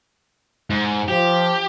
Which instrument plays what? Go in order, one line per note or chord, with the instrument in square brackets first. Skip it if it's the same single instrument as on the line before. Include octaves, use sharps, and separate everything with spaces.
[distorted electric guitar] G#2
[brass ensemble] F3 [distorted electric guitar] G4